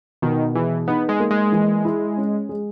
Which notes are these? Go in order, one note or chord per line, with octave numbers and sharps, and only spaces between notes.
B2 D#3
E3 G#4
B3 D#4
G#3
A#3
G#3
E3
E4
C#4
G#3